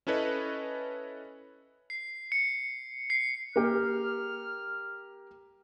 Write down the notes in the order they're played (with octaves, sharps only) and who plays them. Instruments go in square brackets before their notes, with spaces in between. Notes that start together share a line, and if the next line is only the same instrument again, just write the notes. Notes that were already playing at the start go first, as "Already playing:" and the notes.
[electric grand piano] C#4 E4 A4 B4 C#5 D#5
[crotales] C7
C#7
C7
[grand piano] A#3 G4 [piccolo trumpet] F6